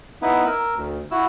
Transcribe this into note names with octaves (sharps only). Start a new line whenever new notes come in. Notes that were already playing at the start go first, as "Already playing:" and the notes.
B3 D#4 E4 B4
A#4 E6
D2
E4 F#4 E6